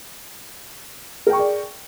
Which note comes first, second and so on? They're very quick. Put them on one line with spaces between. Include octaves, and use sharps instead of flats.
A#4 G5 C#6 G#4 D5